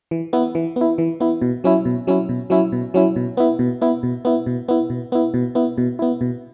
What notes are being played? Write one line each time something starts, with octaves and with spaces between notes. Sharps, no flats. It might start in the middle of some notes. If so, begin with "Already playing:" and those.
E3
B3 E4
E3
B3
E4
E3
B3 E4
B2
F#3 C#4 E4
B2
F#3 C#4 E4
B2
F#3 C#4 E4
B2
F#3 C#4 E4
B2
B3 E4
B2
B3 E4
B2
B3 E4
B2
B3 E4
B2
B3 E4
B2
B3 E4
B2
B3 E4
B2